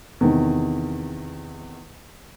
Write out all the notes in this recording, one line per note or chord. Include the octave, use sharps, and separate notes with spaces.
E2 C3 D#3